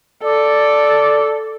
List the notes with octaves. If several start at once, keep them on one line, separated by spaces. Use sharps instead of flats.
A4 D5